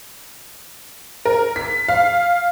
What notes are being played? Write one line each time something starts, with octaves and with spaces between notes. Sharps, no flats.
A#4
B6
F5